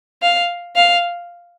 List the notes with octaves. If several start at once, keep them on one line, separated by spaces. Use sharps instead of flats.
F5
F5